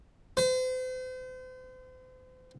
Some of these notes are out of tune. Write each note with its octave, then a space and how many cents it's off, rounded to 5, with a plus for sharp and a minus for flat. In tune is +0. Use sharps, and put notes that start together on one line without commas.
C5 -40